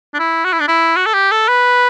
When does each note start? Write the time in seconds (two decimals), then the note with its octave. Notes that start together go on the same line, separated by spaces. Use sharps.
0.14 D4
0.19 E4
0.45 F#4
0.53 E4
0.60 D4
0.68 E4
0.97 F#4
1.06 A4
1.14 G4
1.31 A4
1.49 B4